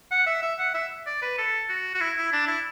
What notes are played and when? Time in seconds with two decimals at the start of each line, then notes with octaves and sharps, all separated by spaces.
0.12 F#5
0.26 E5
0.43 E5
0.59 F#5
0.75 E5
1.07 D5
1.22 B4
1.38 A4
1.69 F#4
1.95 F#4
2.01 E4
2.17 E4
2.33 D4
2.48 E4